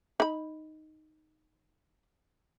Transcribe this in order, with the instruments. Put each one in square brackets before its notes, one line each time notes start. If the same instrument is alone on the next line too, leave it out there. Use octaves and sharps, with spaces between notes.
[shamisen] D#4 B5